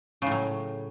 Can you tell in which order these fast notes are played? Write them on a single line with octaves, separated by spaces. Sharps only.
C#3 A2 F#3